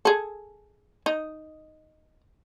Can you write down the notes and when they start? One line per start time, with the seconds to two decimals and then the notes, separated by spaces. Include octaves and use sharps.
0.05 G#4 A4
1.06 D#4